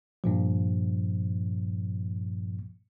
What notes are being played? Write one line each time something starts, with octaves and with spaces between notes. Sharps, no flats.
G2 A#2 F3